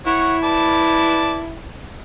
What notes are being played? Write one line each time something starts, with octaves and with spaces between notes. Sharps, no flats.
E4 C#5 F#5
B4 D5 A5